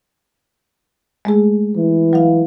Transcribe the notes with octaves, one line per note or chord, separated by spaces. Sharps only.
G#3 A3 G#4
E3
F#3 F5